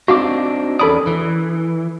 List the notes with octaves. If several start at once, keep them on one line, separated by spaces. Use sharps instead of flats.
C4 D4 D#4 F#4 F5 D6
E2 C#4 A4 D5 B5 D#6
E3